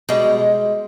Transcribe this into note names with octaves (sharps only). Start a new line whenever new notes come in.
B2 G3 G#3